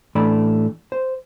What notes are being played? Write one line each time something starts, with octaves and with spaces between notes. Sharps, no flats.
A2 E3 A3 D4 D5 B5
C5